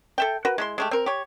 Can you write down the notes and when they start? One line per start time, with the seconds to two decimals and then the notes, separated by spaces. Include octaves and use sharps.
0.18 A4 E5 G5
0.45 F#4 A#4 B4
0.58 G#3 E4 C6
0.78 G#3 A3 G4
0.91 C4 A#4
1.06 G4 C#5